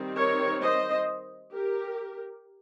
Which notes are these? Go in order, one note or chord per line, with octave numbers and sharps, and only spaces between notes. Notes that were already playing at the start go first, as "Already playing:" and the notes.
Already playing: D#3 G3 C4
A#4 C#5
C5 D#5
G4 A#4